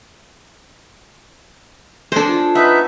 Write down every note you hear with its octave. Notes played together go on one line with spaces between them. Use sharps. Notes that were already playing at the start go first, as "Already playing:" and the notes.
G#3 D4 A4 C5
F4
B3 D#4 B4 E5